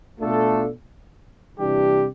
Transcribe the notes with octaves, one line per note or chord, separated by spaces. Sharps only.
B2 A3 D4 F4 A4
C3 E3 G3 D4 G4